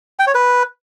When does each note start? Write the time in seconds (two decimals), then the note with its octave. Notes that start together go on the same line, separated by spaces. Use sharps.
0.19 G5
0.27 C#5
0.35 B4